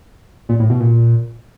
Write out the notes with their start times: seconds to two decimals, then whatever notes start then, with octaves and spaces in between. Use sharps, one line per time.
0.49 A#2
0.59 A2
0.70 B2
0.80 A#2